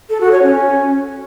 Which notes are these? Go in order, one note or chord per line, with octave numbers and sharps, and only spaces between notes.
A4
F#4
C#5
C#4